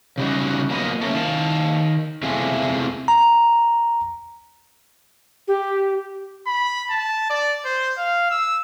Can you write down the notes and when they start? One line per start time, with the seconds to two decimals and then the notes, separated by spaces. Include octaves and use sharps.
0.18 C#3 G3 D#4 F#4
0.70 F#3 A#3 B3 F4 B4 D#5
1.01 A3 A#3 C#4
1.15 D#3 F5 A5
2.23 E2 C3 G#3 A3 F4
3.08 A#5
5.47 G4
6.47 B5
6.90 A5
7.30 D5
7.65 C5
7.98 F5
8.31 E6